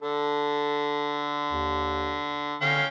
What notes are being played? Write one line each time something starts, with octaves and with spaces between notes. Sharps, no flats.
D3 A4
D#2
D3 C#4 F5 G5